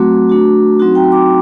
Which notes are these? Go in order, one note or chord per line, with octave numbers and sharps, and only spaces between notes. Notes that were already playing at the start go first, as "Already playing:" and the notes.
Already playing: F#3 A3 C4 F#4 A#5 D6
A3 D4 F#4
F#3 C4 D#4 F#4
G5 A#5
C6
A#5 D6